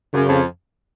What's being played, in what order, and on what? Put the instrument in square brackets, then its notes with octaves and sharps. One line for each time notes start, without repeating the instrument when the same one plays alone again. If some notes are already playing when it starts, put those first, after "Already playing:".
[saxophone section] F#2 [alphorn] C#3
[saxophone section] F2